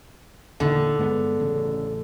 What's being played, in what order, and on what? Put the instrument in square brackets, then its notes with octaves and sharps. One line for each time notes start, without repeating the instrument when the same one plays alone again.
[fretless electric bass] E2 A#2 D#3 [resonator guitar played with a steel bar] D3
[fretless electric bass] G2 G#3 B3
A1 C#3